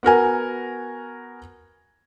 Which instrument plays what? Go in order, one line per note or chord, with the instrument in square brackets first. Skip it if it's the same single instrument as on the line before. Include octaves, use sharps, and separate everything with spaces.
[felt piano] B3 F#4 A#4 G#5